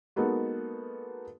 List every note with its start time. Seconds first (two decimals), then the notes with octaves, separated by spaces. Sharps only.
0.16 G#3 A#3 B3 D#4 F#4 A4